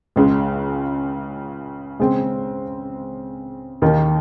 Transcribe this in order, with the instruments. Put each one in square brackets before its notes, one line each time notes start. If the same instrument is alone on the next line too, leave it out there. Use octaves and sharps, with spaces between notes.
[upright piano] C#2 C#3 G#3
C#3 G#3 C4
D#2 D#3 A#3 D#4